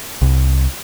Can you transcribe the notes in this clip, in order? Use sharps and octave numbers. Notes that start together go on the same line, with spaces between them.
C2